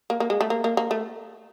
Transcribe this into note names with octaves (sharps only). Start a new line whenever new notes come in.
A#3
A#3
G#3
A3
A#3
A#3
A#3
A3